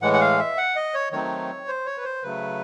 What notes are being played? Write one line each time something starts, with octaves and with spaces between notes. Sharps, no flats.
A2 E3 G#3 F#5
F#5
F5
E5
F#5
D#5
C#5
D#3 F#3 A3 C4 D#4 C#5
C5
C#5
B4
C5
C#3 F#3 A3 B4